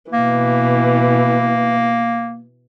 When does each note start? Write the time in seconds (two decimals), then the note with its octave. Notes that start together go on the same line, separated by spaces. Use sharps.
0.12 B2 E3 A#3